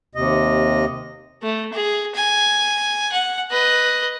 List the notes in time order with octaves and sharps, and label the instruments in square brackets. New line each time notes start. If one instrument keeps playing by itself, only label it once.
[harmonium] D#2 C3 D#5
[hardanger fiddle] A3
G#4
G#5
F#5
B4 D#5